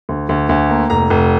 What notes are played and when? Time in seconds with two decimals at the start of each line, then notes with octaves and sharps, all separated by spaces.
0.09 D2
0.29 D2
0.49 D2
0.70 A#3
0.90 F1 A#5
1.10 F1